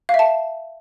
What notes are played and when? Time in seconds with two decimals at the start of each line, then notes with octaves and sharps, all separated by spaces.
0.09 F5
0.14 E5
0.19 A5